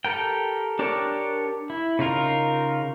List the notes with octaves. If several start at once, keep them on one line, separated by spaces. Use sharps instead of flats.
G4 A4 A#4 G5
D4 G4 A#4 C#5 D5
E4
C#3 D#4 F4 A#4